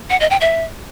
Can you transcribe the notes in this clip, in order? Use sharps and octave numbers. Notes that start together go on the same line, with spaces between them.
F#5
D#5
G5
E5